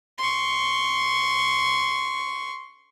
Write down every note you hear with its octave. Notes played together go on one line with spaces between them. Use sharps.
C6 C#6